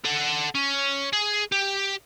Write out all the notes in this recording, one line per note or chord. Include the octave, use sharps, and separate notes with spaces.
A4 F#5
C#4
G#4
G4